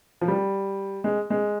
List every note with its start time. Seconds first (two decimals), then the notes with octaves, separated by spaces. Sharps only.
0.21 F3
0.28 G3
1.04 G#3
1.30 G#3